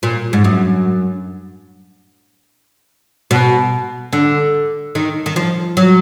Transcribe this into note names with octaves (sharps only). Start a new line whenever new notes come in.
A#2
G#2
F#2
B2
D3
D#3
D#3
F3
F#3